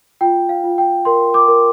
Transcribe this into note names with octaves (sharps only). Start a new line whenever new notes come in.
F4 G5
F5
F4
G5
A#4 C6
D6
A#4